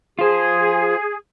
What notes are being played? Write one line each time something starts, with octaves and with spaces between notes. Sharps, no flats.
F4 G#4 C5